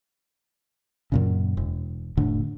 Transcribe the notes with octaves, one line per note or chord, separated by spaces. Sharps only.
F#2 A#2 C#3
E1
F1 A2 D3